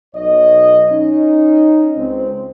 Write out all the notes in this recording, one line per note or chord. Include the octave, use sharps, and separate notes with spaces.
B1 C#5 D#5
C#4 D#4
C#2 C4